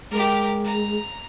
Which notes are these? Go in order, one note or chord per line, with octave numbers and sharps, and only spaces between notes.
G#3 G4 A#4
A#5